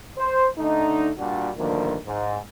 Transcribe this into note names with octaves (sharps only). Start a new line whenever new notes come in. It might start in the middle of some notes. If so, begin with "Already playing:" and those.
C5
D3 A3 D4 D#4
A#2 G3 D4 F#4
D2 G2 D3 D#3 F3 A#3
G#2